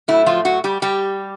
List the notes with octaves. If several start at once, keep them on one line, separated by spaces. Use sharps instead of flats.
A2 F#3 A3 E4
F3 F4
F#3 F#4
G3 G4
G3 G4